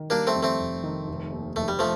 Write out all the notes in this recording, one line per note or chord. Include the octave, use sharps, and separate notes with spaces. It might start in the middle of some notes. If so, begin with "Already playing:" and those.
Already playing: D#3
G3 A#3 D4
A3 C4
F2
A3 C4
F1
D#3
F1
D#2
F1 A3
G3
F3 A3